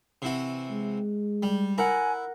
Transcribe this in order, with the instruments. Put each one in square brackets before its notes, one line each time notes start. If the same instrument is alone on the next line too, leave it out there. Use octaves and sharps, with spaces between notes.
[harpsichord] C3 E3 F#4
[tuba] G#3
[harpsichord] G3
[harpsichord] E4 [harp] A#4 F#5 [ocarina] G#5